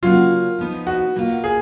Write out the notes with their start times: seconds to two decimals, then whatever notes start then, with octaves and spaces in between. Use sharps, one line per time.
0.02 C#3 F#3 A#3 C#4 F4
0.59 F3 B3 D#4
0.87 F#4
1.16 B2 A#3 F4
1.44 G#4